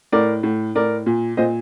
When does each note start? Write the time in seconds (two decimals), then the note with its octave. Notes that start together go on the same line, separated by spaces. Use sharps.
0.12 A2 A#4 D5
0.43 A2
0.75 A2 A#4 D5
1.06 A#2
1.37 A#2 C5 D#5